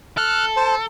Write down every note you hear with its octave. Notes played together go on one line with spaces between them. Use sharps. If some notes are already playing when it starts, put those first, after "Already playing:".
A4 F6 F#6
C5 A5